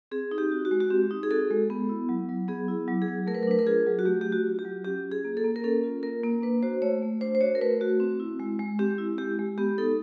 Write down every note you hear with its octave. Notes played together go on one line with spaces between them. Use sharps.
C4 G#4
D#4
G4
F#4
F#4
G#3
F#4
C4 G4
D#4
G#4
F#4 A4
G#3
B3
E4
F#3
F#3
B3 G#4
E4
F#3
G#4
F#3
A3 A#4
B4
A#4
D4 B4
A#4
F4 G#4
F#3
F#4
A3 G4
D4 G4
F#4
F4
G4
F#3
C#4 G4
F4
G#4
A#3
A4
A#3
A#4
C#4 A4
F4
A#3 A#4
A#3
D4 B4
F#4 C5
A3 C#5
A3
D4 C5
C5
F#4 C#5
A#4
A3 B4
A3 F#4
C4
E4
G#3
G#3
C4 G4
E4
G#3 G4
G#3
B3 G4
D#4 A4